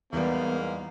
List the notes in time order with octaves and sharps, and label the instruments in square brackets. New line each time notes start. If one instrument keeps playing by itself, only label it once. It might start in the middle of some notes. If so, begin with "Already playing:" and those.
[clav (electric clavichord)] E2 G3 [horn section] G#2 A#3 [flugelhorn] B3